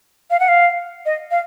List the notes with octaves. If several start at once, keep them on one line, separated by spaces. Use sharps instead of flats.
F5
F#5
F5
D#5
F5